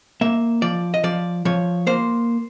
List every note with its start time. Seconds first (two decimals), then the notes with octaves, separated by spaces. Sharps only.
0.21 A#3 E5
0.62 F3 D5
0.94 D#5
1.04 F3 D5
1.45 F3 C#5
1.87 A#3 C5